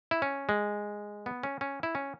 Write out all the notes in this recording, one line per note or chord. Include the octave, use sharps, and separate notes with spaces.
E4
C#4
G#3
B3
C#4
C#4
E4
C#4